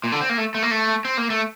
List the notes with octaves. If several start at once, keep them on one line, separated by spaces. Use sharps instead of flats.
A#2
D3
C4
A#3
A3
A3
A#3
A3
C4
A#3
A3